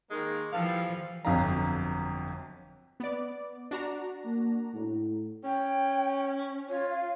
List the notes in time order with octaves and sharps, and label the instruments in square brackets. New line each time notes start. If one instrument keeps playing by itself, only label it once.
[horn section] D#3 G#3 A#3
[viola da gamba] E3 F3 [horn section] G3 B3 A4 [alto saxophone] F5
[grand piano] G1 F2 F#3 F5 A#5
[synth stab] B3 D5
D4 F#4 A#5
[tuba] A#3
A2
[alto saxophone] C#4 [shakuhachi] G5
[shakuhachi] F4 [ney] C#5
[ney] F5